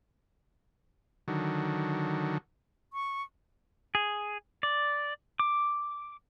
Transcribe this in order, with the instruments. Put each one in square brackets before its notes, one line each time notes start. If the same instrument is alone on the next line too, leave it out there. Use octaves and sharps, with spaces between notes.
[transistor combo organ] D3 D#3 F#3
[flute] C#6
[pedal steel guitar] G#4
D5
D6